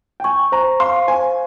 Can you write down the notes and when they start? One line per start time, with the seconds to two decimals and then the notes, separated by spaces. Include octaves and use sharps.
0.20 G5
0.24 G#5 C#6
0.52 C5 A#5
0.80 F5 C6
1.08 C5 G#5